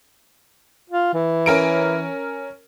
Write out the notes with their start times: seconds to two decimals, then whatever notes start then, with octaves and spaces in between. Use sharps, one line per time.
0.90 F4
1.14 E3
1.46 C#4 A#4 D7